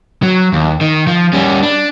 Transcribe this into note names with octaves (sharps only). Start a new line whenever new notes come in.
F#3
D#2
D#3
F3
G3 C#4
D4